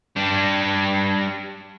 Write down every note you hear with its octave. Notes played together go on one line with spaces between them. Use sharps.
G3 D4